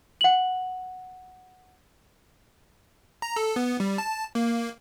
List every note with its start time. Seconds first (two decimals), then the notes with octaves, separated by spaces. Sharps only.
0.21 F#5 F#7
3.22 A#5
3.36 A4
3.56 B3
3.80 G3
3.98 A5
4.35 A#3